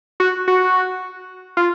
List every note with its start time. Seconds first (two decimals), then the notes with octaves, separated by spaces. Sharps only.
0.20 F#4
0.48 F#4
1.57 F4